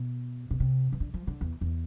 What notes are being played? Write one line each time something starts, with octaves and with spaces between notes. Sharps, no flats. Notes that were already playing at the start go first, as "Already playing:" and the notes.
Already playing: B2
B2
C3
E3
D3
F3
D3
E2
E2